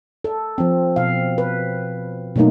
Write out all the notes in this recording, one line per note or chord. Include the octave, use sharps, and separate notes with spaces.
A4
F3 C4
B2 F5
B4
B2 F#3 A3 A#3 D#4